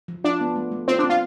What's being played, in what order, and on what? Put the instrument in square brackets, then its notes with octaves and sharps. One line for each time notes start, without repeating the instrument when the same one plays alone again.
[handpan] F3
[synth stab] D4 [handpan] F4
[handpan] B3
A3
A3
[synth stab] C4 [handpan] F4
[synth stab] D4
[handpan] C4
[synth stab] F4